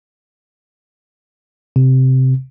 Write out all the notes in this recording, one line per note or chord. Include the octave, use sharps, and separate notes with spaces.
C3